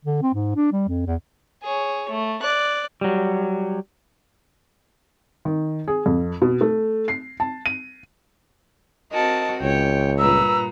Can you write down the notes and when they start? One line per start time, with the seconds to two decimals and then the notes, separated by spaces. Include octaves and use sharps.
0.05 D3
0.22 C4
0.34 G#2
0.56 D4
0.73 G3
0.88 F2
1.06 E2
1.63 G#4 C#5
2.09 A3
2.43 D5 F#6
3.01 F#3 G3
5.45 D#3
5.88 G#4
6.06 F2
6.42 B2
6.61 A3
7.08 C7
7.40 A5
7.66 D#7
9.12 C4 F#4 A#4 D#5 A5
9.61 C#2 C#5 G5
10.19 G2 A#2 B4 A#5 E6